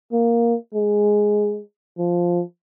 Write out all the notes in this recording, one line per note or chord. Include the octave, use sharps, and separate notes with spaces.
A#3
G#3
F3